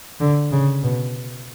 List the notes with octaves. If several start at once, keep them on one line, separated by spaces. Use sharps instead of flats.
D3
C#3
B2